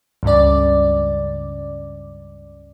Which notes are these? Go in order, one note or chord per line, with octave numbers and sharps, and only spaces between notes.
C#2 G2 C#3 D5